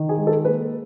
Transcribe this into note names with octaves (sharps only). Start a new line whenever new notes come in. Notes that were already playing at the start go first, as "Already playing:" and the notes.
Already playing: D#3
G#4
G#3
A4
A#3 B4